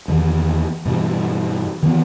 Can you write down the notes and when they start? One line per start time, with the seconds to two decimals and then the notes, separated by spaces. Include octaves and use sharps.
0.08 E2 D#3
0.85 G2 B2 E3
1.83 D#3 E3 B3